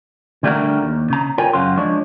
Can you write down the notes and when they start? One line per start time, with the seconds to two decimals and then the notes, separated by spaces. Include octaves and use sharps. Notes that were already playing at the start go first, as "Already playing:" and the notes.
0.43 D3 G3 A3 D4 F#4 A#4
0.82 D#2
1.10 C#3 A#5
1.38 F4 A#4 C#5 G5 G#5
1.53 F#2 C#3 F4 F#4 C6
1.77 F3 G#3 D4 C#5